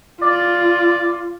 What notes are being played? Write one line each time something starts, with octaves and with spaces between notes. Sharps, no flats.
F4 D5